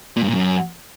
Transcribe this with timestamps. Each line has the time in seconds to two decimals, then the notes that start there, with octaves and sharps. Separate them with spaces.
0.17 A#2
0.22 G2
0.28 A#2
0.33 F#2